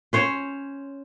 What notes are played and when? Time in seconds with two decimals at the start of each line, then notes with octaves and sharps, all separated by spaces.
0.13 C#4 C5 C#5